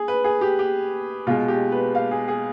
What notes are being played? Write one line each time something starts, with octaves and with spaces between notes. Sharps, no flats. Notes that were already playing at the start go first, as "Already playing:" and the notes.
Already playing: G#4
B4
G#4
G4
G4
B2 G#3 F4
G4
B4
F5
G#4
G#4